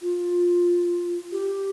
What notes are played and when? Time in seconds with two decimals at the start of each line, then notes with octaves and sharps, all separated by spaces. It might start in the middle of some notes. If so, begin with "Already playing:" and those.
0.02 F4
1.32 G4